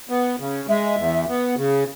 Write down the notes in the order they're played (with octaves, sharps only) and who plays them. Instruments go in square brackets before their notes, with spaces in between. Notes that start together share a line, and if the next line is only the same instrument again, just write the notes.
[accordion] B3
C#3
[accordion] G#3 [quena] E5
[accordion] E2
B3
C#3